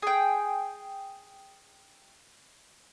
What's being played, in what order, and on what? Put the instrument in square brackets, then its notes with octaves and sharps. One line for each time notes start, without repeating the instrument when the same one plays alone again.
[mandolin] G#4 G5